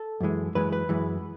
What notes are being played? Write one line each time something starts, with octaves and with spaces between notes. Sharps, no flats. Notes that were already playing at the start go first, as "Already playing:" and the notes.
Already playing: A4
F#2 E3 G#3
F#2 E3 G#3 B4
B4
F#2 E3 G#3